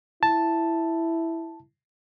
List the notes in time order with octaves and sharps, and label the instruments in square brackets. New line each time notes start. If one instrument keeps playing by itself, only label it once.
[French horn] E4 [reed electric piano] A5